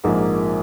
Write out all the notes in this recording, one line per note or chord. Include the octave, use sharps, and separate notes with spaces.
A#1 G#2 F3 A#3